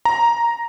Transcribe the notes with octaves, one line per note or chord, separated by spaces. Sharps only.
A#5